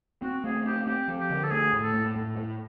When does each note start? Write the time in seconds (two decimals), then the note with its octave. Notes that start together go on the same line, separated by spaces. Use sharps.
0.22 C4 F#4
0.44 A3 G#4
0.65 C4 G4
0.87 C4 G4
1.08 F3
1.19 G4
1.30 D3
1.44 A4
1.51 A3 G#4
1.73 A2
1.83 A4
1.94 A2
2.16 A2
2.37 A2